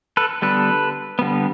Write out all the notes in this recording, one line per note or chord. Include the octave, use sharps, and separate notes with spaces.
A4 B4
D3 G3 B3 A4 B4
D3 G3 B3